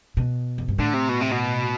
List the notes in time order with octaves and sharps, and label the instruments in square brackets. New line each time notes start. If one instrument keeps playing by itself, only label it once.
[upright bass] B2
F2
G2
[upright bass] A2 [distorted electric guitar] D3
[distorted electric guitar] C3
B2
C3
B2